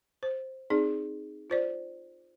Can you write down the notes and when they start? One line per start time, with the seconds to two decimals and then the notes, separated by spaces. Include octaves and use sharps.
0.23 C5
0.70 C4 D#4 G#4 D5
1.50 F4 C5 D5